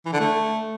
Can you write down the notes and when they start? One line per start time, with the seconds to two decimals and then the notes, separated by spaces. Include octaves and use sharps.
0.06 E3
0.13 D3
0.20 A3